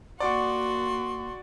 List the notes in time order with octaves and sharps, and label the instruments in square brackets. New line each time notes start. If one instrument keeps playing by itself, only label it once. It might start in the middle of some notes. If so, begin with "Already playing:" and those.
[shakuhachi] A#3 [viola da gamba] F#4 [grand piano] D5 F#5 C#6 [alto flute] C6